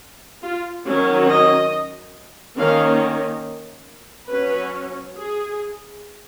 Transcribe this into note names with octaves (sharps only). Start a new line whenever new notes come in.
F4
D#3 F#3 C#4
D#5
D#3 A#3 C#4 F5
F#3 C#4 B4
G#4